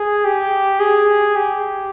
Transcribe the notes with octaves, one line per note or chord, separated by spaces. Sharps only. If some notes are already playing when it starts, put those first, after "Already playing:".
Already playing: G#4
G4
G#4
G4